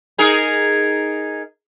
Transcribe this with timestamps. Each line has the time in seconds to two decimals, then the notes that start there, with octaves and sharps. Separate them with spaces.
0.18 D#4 G#4 A#4